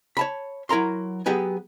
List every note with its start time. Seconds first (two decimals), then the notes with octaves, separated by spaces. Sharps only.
0.17 C#5 A5 B5
0.69 F#3 E4 A#4 A#5 C6
1.26 F#3 B3 G4 G#4 B4